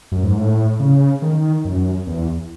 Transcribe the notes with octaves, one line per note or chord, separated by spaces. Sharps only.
F#2
G#2
A2
C#3
D#3
F#2
E2